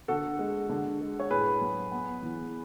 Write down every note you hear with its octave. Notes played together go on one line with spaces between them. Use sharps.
D3 F#4 A4
G#3
D3
G#3
C#5
A2 G#4 B4
F#3
B3
E3